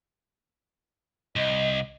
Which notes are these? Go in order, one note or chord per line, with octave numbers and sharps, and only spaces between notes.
C2 D#5